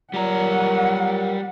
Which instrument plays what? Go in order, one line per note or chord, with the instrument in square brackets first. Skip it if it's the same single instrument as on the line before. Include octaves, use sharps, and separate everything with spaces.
[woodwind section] A#2 F#3 [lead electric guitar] G3 A#5 [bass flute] A#4 [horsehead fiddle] F#5